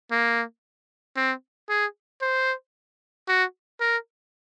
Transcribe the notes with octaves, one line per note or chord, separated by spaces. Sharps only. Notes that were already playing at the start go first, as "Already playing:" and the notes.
A#3
C4
G#4
C5
F#4
A#4